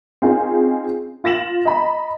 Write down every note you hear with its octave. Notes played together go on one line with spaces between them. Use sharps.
C4 C#4 D#4 F4 G#4
F4 A6 A#6 E7 F#7
D#5 A#5 B5